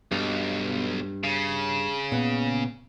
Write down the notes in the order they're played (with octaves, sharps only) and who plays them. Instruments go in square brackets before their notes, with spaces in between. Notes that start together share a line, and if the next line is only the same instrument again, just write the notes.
[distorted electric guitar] B1 [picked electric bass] G2
[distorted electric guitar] C#3
[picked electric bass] A#2 B3